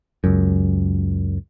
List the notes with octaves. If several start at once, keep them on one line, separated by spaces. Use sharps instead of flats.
C#2 F#2